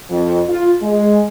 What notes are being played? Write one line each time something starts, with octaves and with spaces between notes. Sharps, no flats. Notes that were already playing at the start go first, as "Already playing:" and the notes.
F2
F4
G#3